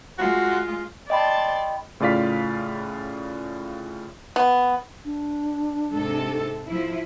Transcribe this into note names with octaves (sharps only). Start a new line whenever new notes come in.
G#3 F4 F#4
D5 D#5 G5 A5 B5 C6
A2 C#3 F4 D5 F5 B6
B3
D4
G#2 C3 A4
F3 E4